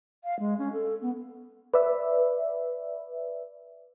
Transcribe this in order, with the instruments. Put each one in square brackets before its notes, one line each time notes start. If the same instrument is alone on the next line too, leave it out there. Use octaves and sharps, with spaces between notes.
[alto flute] F5
G#3
C#4
A4
B3
[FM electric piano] B4 D5 E5